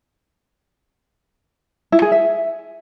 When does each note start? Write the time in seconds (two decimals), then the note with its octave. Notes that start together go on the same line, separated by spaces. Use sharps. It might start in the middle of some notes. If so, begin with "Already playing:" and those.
1.92 E4
2.02 G#4
2.12 E5